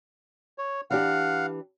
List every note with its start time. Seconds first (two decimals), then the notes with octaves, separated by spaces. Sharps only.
0.58 C#5
0.91 E3 D4 G4 F5 F#5